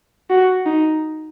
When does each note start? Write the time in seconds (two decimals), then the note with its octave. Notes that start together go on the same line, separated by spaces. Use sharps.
0.30 F#4
0.66 D#4